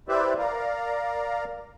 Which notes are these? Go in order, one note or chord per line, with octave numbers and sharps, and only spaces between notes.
E4 G4 B4 C5 D5 E5
A#4 D5 F5 A#5